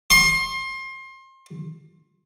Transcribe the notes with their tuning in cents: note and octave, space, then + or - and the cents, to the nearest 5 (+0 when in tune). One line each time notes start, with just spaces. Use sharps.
C6 +30